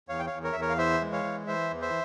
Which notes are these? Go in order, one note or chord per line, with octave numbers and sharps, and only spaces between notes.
E2 C#5 F5
G5
C#5 F5
E2
A#4 C#5
E2 E5
A#4 C#5
F5
E3 C5 E5
G#3
C#5 F5
E3
E3 C5 E5
E2
C5 E5